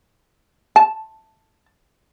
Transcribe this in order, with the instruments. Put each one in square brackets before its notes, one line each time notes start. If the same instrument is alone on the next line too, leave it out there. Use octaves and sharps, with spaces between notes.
[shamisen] A5